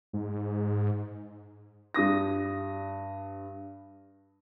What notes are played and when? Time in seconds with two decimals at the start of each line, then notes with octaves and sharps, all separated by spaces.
0.13 G#2
1.94 G2 D4 D#6 A#6